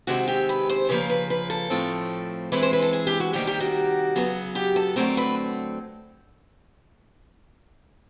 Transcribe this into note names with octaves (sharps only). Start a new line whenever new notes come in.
C3 D#3 G#3 C4 F#4
G4
B4
C5
C#3 F3 A#3 B4
B4
B4
A4
A2 F3 A3 C4
E3 G#3 C4 B4
C5
B4
A4
G#4
G4
F#4
C3 D#3 G3 A#3 G4
G4
F#4
C#3 F#3 B3
G4
A4
D3 F#3 A3 C4 A#4
B4